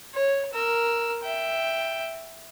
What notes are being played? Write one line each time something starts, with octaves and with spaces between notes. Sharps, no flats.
C#5
A#4 E6
E5 G5